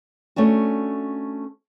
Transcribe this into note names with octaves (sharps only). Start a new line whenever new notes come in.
A3 C#4 D4 F#4